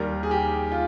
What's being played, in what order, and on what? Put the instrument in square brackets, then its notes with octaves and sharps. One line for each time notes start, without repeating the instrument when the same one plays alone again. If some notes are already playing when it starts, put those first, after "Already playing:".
Already playing: [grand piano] D#2 D#3 G3 A#4
G#4
G4
F4